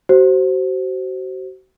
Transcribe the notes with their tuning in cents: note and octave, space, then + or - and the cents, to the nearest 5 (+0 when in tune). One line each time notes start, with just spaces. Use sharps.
F#4 +35 C5 +0